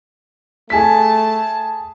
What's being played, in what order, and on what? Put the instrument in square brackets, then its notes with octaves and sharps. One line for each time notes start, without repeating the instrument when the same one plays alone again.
[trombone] A3 [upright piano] G#4 B6 [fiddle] A5